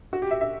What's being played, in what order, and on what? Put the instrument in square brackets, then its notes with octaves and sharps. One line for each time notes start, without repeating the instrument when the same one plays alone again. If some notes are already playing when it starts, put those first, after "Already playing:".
[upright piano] F#4
G4
E5
E5